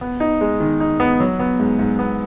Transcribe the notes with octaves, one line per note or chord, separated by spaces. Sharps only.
B3
D#4
G#3
D#3
D#4
B3
F#3
B3
G#2
G#2
B3